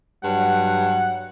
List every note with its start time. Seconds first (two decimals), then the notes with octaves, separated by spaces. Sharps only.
0.24 G2 F#3 F#5